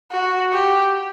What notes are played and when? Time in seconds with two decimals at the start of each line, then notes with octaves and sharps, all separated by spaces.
0.12 F#4
0.53 G4